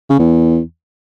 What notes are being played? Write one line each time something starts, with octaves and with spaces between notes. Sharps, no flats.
C#3
E2